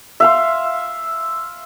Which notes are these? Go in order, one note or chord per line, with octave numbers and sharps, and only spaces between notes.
E5 F5 C6